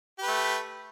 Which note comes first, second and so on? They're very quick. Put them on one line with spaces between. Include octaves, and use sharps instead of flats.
G4 B4 A3